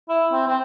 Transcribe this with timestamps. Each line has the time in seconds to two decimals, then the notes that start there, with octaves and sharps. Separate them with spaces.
0.09 E4
0.32 C4
0.48 C4